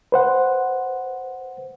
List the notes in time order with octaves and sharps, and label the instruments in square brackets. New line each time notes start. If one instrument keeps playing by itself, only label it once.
[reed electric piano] B4 C5 F#5